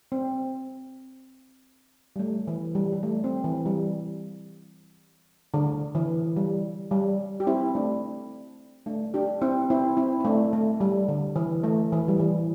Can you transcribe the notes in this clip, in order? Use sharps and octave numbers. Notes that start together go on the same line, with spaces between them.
C4
G3
A3
E3
G3
G3
A3
C4
E3
G3
D3
E3
G3
G3
G4
C4 E4
A3 D4
A3 D4
D4 G4
C4 E4
C4 E4
C4 E4
E4
A3 D4
A3
G3
D3
E3
A3
E3
G3
E3